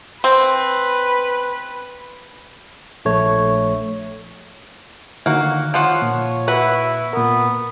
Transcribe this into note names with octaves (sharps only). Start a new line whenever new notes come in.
C4 B4
A#1 A3 C#5
D3 D#3 A#3 F#4
F3 F4 C#5 F#5
A#2
E4 F#4 B4
A#2 B3 A#4